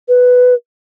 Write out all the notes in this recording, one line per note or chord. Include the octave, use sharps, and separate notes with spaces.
B4